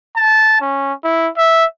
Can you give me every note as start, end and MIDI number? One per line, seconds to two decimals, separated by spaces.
0.17 0.58 81
0.61 0.93 61
1.04 1.29 64
1.37 1.64 76